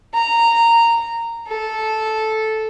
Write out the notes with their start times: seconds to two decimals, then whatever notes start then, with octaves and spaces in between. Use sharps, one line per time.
0.14 A#5
1.48 A4